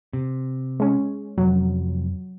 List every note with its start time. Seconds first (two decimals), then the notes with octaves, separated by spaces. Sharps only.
0.13 C3
0.80 G#3 C#4
1.38 F1 F2 F#3